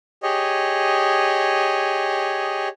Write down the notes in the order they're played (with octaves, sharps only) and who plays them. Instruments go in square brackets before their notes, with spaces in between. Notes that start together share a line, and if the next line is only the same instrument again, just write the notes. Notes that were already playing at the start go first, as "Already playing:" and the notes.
[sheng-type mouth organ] G4 G#4 C#5 D#5